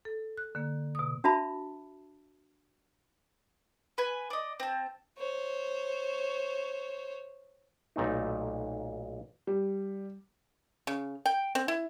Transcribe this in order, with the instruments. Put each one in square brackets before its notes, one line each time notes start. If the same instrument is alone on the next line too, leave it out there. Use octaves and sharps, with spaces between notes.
[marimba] A4
F#6
D3 A#3
B2 D#6
[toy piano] D4 F#4 E5 A5 B5
[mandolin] B4 G#5
D5 D#5
C4 A5
[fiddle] C5 C#5
[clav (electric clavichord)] B1 A#2 A3 D#4
[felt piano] G3
[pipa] C#3
G5
C4
E4